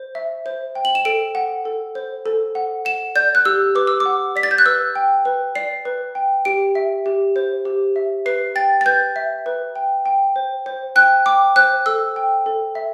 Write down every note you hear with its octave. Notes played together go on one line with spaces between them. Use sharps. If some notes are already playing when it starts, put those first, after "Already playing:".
Already playing: C5
E5
C5
G5
F#7
E7
A4 D7
F#5
A4
C5
A4
F#5
F#5 E7
D5 G6
F#6
G4 E6
B4 D6
E6
D6
F#5
D5 B6
A6
G6
F#6
B4 E6
G5
B4
D5 C7
B4
G5
G4 D7
E5
G4
C5
G4
E5
B4 C7
G5 A6
A6
B4 G6
E5
B4
G5
G5
C5
C5
G5 F#6
G5 D6
C5 F#6
A4 E6
G5
A4
E5